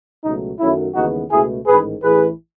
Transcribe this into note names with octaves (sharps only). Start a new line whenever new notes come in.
C#2 B2 F#3 A3 D#4
F#2 D#3 F#3 A3 C#4 E4
D#2 C#3 E3 G#3 B3 D#4 F#4
C#2 B2 A3 E4 G#4
A1 G#2 D#3 G#4 B4
A1 A2 E3 G#4 B4